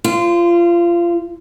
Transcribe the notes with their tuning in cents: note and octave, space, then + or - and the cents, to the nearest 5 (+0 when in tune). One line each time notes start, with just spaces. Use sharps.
F4 -25 C5 +0